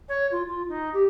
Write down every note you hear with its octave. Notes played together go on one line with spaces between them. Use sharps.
C#5
F4
F4
D#4
G4